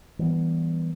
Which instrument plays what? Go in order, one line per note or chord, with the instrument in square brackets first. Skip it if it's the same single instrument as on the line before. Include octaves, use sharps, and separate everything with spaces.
[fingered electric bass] E3 G3 B3